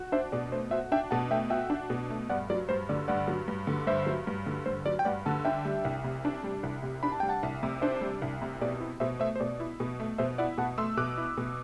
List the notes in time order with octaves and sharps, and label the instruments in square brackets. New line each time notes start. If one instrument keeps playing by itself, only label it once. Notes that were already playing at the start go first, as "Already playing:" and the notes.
Already playing: [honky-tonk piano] F#4
[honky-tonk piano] D4 [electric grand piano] C5 E5
[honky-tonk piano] B2 [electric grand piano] D5
[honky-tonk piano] A3 [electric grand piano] C5
[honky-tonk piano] F#4 [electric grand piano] C5 E5
[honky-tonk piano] D4 [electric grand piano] E5 G5
[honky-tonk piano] B2 [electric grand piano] F#5 A5
[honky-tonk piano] A3 [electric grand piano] E5 G5
[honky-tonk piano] F#4 [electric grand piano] E5 G5
[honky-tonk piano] D4
B2
A3
[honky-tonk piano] G2 [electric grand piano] D5 F#5
[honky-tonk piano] F#3 [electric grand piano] D5
[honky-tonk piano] G2 [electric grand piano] C5
[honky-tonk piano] D3 [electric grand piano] D5
[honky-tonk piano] G2 [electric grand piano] D5 F#5
[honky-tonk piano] F#3
G2
D3
[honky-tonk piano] G2 [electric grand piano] C5 E5
[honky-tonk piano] F#3
G2
D3
[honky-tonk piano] G2 [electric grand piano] C5
[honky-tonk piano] F#3 [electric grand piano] D5
[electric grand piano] G5
[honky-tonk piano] G2 [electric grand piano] D5 F#5
[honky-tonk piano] D3 [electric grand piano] F#5 A5
[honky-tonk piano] D4 [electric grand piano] E5 G5
[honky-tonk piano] G3
C2
C3
D4
G3
C2
C3
[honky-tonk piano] D4 [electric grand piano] B5
[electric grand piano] A5
[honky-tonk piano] G3 [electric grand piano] G5
[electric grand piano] F#5 A5
[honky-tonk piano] C2
C3
[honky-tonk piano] D4 [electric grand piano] C5 E5
[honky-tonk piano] G3
C2
C3
[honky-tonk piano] B2 [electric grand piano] D5
[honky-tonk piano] E4
[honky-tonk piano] B2 [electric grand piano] C5 E5
[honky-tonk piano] A3 [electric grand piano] C5 E5
[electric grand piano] C5
[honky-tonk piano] B2 [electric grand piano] D5
[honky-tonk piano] E4
B2
A3
[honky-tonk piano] B2 [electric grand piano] C5 E5
[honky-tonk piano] E4 [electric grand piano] D5 F#5
[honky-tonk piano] B2 [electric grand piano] F#5 A5
[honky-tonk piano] A3 [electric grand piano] C6 E6
[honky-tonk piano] B2 [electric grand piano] D6 F#6
[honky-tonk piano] E4
B2